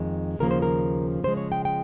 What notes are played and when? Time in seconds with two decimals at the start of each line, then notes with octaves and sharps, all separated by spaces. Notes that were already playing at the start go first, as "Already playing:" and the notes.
Already playing: F2 D#3 G#3
0.39 D#2 C#3 F3 A#3 A#4
0.51 C5
0.62 A#4
1.23 C#3 F3 G#3 C5
1.37 C#5
1.52 G5
1.65 G5